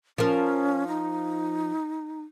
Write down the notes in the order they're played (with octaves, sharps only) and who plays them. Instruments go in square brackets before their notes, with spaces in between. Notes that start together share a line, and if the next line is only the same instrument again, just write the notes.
[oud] F3 A#4 [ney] C#4
[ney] D#4